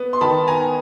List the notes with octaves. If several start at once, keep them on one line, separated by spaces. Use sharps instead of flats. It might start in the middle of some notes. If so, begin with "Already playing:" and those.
Already playing: B3
C6
D#3 A5 B5
B3 G#5 A#5